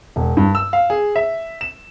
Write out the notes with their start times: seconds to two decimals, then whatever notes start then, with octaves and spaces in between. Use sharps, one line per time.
0.16 E1
0.37 G2
0.55 E6
0.73 F5
0.90 G#4
1.16 E5
1.61 E7